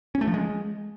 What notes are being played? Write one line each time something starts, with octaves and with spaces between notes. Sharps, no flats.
C#4
A3
F3
G#3